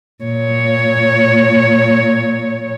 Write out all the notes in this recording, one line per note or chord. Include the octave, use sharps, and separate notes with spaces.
A#2 C#5